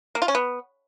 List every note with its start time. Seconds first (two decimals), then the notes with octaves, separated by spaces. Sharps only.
0.15 A#3
0.22 F4
0.28 C#4
0.35 B3